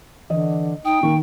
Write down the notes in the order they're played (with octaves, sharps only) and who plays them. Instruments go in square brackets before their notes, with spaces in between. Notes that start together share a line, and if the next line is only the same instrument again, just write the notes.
[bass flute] D3 [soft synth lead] E3 [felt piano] D#5
[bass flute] D#4 [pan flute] G5 [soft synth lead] D#6
[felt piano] D#3 [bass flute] A#3 [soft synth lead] C#6